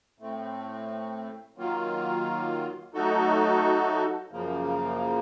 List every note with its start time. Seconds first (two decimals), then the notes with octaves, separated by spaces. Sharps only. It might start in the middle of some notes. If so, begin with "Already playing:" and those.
0.19 A2 A3 C4
1.56 D#3 F#3 A#3 F4
2.94 F#3 A3 D#4 F#4 A4
4.31 F#2 C#3 F3 A#3